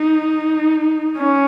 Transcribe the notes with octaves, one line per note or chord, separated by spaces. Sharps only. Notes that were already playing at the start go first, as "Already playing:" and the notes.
Already playing: D#4
C#4